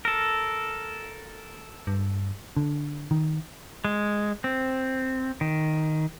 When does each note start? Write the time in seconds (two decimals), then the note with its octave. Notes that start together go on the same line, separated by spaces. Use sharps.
0.05 A4 A#4
1.87 G2
2.57 D3
3.11 D#3
3.84 G#3
4.44 C4
5.41 D#3